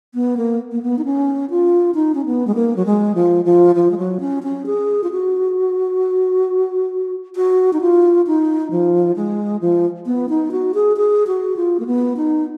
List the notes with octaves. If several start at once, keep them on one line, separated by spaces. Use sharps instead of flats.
B3
A#3
A#3
B3
D#4
C#4
F4
D#4
C#4
B3
G#3
A#3
F#3
G#3
F3
F3
F3
G#3
F#3
C#4
C#4
G#4
F4
F#4
F#4
D#4
F4
D#4
F3
G#3
F3
B3
D#4
F#4
G#4
G#4
F#4
F4
A#3
B3
D#4